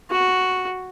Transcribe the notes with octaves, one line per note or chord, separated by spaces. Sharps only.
F#4